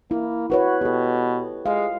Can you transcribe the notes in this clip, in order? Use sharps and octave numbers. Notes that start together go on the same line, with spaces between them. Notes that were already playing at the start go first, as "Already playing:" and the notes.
A#3 E4
E4 F#4 B4 C#5
B2 G4 A4
G#3 F5